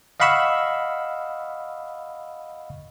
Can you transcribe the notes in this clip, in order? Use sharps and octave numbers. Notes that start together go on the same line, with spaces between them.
D#5 F5 F#5 B5 C#6 E6